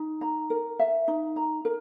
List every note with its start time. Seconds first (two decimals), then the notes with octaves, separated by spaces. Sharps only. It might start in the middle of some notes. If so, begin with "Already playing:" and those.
Already playing: D#4
0.21 A#5
0.50 A#4
0.79 E5
1.08 D#4
1.36 A#5
1.65 A#4